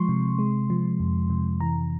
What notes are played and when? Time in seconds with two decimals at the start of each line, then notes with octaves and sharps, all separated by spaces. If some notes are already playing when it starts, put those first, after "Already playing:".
Already playing: F3 G#3 C6 C#6
0.09 C3
0.39 G#3
0.70 F3
1.00 F2
1.30 C3
1.60 E3 A#5